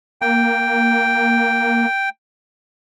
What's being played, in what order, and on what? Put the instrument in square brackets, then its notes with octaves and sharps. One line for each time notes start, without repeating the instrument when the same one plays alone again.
[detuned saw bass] A#3 [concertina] G5